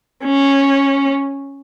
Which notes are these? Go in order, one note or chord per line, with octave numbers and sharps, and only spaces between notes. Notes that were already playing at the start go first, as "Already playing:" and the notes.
C#4